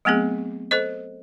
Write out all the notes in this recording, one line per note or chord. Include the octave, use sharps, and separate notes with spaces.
F#3 A3 B3 C4 G#4
A4 C5 D#5